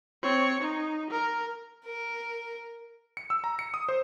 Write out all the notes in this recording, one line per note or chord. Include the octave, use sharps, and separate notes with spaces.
C4 C#5
D#4
A#4
A#4
C#7
E6
A#5
C#7
D#6
C5